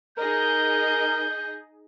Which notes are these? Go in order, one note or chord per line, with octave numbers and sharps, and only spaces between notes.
D#4 G#4 A#4 D#5 G6